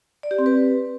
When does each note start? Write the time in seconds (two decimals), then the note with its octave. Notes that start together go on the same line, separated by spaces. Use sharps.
0.23 D5
0.31 G4
0.38 C4
0.46 B4